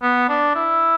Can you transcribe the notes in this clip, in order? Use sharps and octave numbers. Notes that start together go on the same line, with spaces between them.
B3
D4
E4